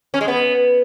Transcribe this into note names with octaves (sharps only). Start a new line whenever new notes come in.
C#4
G#3
B3